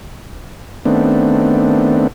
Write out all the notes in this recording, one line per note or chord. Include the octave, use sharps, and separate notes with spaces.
D#3 A3 B3 C4 D4